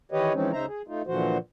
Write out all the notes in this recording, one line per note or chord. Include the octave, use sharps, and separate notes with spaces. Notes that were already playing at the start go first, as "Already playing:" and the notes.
D#3 E3 G4 B4 C#5 D#5
E3 F3 G#3 C4 C#4 D#4
D2 C#3 D#4 C5 E5 A#5
G#4
A3 D#4 F4
A#2 D3 E3 F3 F#4 C5